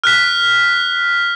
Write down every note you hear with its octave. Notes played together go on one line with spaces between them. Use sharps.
F6 F#6 B6